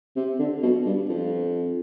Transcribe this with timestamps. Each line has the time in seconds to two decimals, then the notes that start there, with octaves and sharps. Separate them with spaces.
0.16 C3
0.39 D3
0.62 B2
0.86 G2
1.09 F2